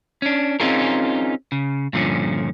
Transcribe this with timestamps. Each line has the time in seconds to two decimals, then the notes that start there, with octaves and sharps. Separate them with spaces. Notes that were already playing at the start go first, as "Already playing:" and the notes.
0.22 C#4 D4
0.60 C4 C#4 D#4 F4 G#4 A#4
1.52 C#3
1.93 G2 A#2 D3 F3 C#4